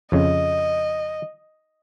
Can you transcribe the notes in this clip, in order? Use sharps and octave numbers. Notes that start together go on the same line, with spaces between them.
F2 C#3 D#5